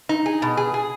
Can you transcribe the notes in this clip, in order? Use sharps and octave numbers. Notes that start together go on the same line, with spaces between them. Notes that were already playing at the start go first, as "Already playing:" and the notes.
D#4
G#4
B2
G#4
G#4